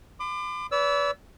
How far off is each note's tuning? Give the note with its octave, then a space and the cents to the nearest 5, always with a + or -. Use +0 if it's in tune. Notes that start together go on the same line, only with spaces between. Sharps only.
B5 +45 D6 +30
B4 +0 D5 -40 E6 +0